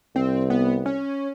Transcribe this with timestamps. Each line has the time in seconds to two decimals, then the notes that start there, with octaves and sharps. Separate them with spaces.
0.16 C2 C4
0.50 B3
0.86 C#4